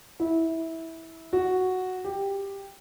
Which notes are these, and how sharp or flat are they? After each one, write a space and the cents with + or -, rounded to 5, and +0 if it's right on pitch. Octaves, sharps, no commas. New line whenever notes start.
E4 -15
F#4 +0
G4 +10